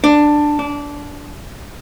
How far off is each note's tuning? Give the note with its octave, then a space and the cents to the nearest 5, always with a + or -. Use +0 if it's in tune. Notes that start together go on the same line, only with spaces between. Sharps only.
D4 +10
D4 -20